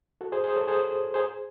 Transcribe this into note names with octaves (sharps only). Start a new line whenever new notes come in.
F#4 A4
G#4 C5
G#4 C5
A4 C#5
G#4 C5
G#4 C5